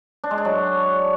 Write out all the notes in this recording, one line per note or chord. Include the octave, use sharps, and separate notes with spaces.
D4
G#3
D4
F#3